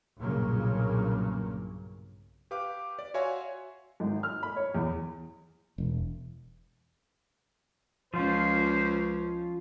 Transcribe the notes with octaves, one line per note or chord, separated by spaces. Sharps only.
B1 G2 A#2 C#3 F#3 A#3
G4 B4 F5 D6
D5
F#4 C#5 E5 F5 G#5 C6
G#1
F6
B5
C#5
E2
E1
C#2 F3 C#4 F4 C5